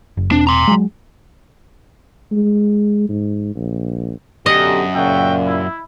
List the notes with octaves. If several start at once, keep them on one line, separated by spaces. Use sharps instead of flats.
F#1
E1 C4 D4
A#5 C6
F#3 G#3
G#3
G#2
A#1
F#2 B2 D3 G4 D#5
A#2 C#3 F#4 E5 G5
E4